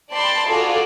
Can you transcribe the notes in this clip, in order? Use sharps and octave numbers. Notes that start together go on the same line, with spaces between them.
D5 G5 A5 B5 C6
F4 F#4 G#4 A4 D5